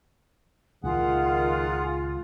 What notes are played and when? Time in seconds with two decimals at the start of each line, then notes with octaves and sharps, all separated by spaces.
0.84 C#2 A#2 D#3 F4 G#4 F#5